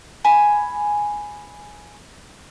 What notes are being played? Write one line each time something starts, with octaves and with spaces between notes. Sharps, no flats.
G#5 B5